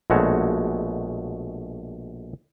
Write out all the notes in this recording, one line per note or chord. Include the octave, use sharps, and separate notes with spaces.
A#1 B2 G#3 A3 F#4 C#5